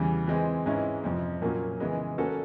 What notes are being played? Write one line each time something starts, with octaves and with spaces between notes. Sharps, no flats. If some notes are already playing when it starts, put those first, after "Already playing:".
Already playing: E2 C#3 E3 G3
E3 G#3 C4
G#2 E3 G#3 C#4 E4
F2 C3 F3
A#2 F#3 A#3 C#4
C#3 E3 G#3 B3
A#3 C#4 F#4 A4